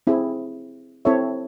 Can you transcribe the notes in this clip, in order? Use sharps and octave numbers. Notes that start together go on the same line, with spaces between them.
C4 E4 G#4
C4 E4 A4 C#5 E5